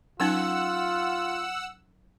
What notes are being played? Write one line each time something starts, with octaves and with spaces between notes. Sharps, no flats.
F#3 C#4 D#4 F4 F#5 E6